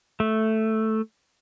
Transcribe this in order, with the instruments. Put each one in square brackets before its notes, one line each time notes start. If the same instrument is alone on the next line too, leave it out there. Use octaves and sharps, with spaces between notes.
[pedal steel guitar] A3